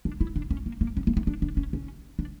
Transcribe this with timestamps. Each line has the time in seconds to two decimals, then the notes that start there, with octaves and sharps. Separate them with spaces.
0.05 D4
0.21 E4
0.36 D4
0.51 C#4
0.66 A#3
0.81 A#3
0.97 C#4
1.07 A#3
1.17 A3
1.27 D4
1.42 D4
1.57 C#4
1.73 C#4
2.19 D4